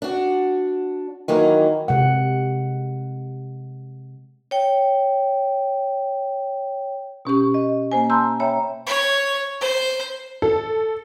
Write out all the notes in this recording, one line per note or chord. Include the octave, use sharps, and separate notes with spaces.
D4 F#4
D#3 E3 F#3 A#3
C3 G#3 F#5
C#5 G5
B2 C#4 G4 C#6
D#5
A#3 C5 G#5
A5 A#5 C6 E6 G6
C#5 E5 G5 A#5 B5
C#5
C5
A4